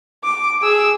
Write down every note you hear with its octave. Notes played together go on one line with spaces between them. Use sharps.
D6
G#4 E6